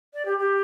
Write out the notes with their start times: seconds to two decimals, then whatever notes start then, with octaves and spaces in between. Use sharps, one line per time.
0.14 D5
0.25 G4
0.38 G4